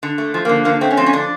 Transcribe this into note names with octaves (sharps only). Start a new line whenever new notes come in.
D3
A3
F3
D3 A#3
D3 A#3
A3 C4
C#4
F3 C4
C#4
D3 D4